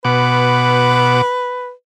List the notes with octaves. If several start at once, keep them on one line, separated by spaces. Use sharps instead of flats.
B2 B4 F#5 D6